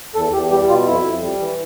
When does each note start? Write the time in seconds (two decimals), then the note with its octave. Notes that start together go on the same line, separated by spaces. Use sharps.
0.15 E2 A4
0.32 E2 G4
0.50 G3 G4
0.69 B2 F4
0.86 F2 E4
1.04 F2
1.22 G3
1.40 E3